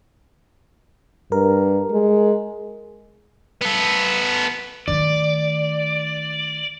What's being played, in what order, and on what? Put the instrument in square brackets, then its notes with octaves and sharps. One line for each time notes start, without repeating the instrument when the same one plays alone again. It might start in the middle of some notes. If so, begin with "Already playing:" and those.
[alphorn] G2 [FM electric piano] A#4
[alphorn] G#3
[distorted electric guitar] B3 A4
[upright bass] D#3 A3 [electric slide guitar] D5